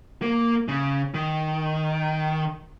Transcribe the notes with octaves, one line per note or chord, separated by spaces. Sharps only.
A#3
C#3
D#3